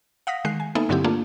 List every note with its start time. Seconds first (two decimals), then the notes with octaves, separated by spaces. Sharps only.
0.27 F5 F#5 D#6 A#6 B6
0.45 D#3 G#3 F#6 C7
0.60 G#5
0.75 A#3 B3 D#4 A4 E5 G#5
0.89 G2 D3 F#3 C4 E4 G4
1.04 A3 A#3 D4 F4 G#4